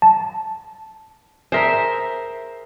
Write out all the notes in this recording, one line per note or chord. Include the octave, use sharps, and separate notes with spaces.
A5
G#4 A#4 C5 E5